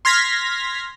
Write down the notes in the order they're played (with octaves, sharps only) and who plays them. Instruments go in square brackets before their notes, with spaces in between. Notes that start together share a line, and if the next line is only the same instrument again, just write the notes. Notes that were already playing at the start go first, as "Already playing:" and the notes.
[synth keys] C6 F6 G#6 A#6 B6